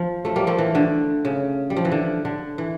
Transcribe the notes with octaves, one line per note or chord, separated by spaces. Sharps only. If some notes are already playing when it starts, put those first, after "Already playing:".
Already playing: F3
F3 A3
G3 A#3
F3 A3
E3
D3
C#3
G3
F3
E3
D3
D3
E3